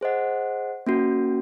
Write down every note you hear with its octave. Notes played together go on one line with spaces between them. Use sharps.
G#4 C5 D#5 F#5
A#3 C#4 F#4